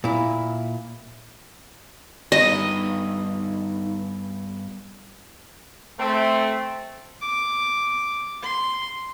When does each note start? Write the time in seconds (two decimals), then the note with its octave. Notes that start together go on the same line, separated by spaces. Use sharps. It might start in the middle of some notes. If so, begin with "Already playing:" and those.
0.04 A#2 E4
2.32 G2 B3 D#4 G4 D#5
5.99 A3 C4
7.21 D6
8.42 C6